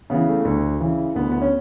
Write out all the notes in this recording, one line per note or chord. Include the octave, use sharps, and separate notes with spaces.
C#3 E3 B3
A3
D2
C#3 E3
D2 B3
B3
C#4